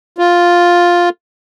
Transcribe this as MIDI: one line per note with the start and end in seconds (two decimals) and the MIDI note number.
0.18 1.09 65